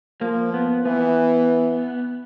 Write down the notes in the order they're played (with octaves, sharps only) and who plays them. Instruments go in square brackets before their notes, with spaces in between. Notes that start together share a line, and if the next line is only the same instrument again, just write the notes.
[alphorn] F3 [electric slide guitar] A#3
[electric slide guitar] B3
[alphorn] E3 [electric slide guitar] B3